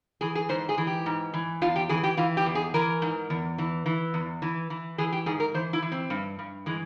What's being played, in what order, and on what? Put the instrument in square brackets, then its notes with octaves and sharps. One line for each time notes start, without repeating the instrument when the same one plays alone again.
[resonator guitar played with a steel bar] E3 G#4
G#4
G#2 C5
G#4
E3
G4
G#2
E3
E2 F4
G4
E3 G#4
G4
E3 F4
G4
E2
G#4
E3 A#4
G#2
E2
E3
E3
E2
E3
E3
E3 G#4
G4
G#2 G#4
A#4
E3 C5
E4
E3
C4
G2
G2
E3 G#3